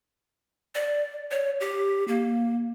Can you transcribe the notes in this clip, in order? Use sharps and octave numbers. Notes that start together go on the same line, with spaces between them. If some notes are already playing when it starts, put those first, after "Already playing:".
D5
C#5
G4
A#3